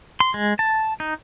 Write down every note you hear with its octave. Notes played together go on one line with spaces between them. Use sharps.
C6
G#3
A5
D#4